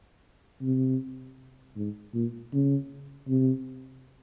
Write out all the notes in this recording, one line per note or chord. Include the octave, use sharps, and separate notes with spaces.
C3
G#2
A#2
C#3
C3